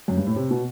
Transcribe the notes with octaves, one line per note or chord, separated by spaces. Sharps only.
F#2
G2
A2
C3
B2